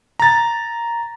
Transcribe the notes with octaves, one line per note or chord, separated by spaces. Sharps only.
A#5 A6